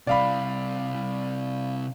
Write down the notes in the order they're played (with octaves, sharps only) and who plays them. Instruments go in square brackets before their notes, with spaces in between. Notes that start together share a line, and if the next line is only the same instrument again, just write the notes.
[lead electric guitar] C3 G3 [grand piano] D5 F5 B5